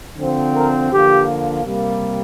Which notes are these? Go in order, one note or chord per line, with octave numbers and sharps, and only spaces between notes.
D3 F3 C4
A#4
D3 F3 A#3 G4
C3 G3 A#3